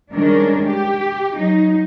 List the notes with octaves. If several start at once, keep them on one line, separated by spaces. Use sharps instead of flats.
D#3 G3 G#3 C#4 D4 A#4
G4
F#3 D#4